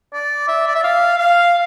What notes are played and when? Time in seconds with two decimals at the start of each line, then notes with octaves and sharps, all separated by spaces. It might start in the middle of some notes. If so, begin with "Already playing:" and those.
0.13 D5
0.48 E5
0.67 D5
0.75 E5
0.83 F5
1.18 F5